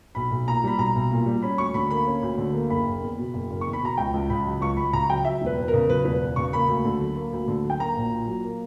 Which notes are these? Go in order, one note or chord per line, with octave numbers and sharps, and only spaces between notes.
B1 B5
B1
A#2 A#5
G3 B5
B1 A#5
B1
A#2
G3
C#4 B5
D2 C#6
D3 B5
A#3 B5
C#4
D2
D3
A#3
F#1 B5
F#1
E2
B2
F#1
F#1
C#6
E2
B5
B2 A#5
C#2 G5
C#2
C#3 B5
F#3
C#2 C#6
C#2 B5
C#3 A#5
F#3 G5
F#3 E5
E1 B4
E2
A#4
C#3
F#3 B4
E1 B4
E2
C#3 C#6
A#3 B5
D2
D3
F#3
A#3
D2
D3
F#3
G5
A#3 A#5
A#1
A#2
F#3
A#3